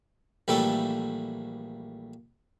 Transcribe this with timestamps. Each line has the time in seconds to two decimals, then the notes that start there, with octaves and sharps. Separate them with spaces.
0.48 A#1 E3 G3 A3 A4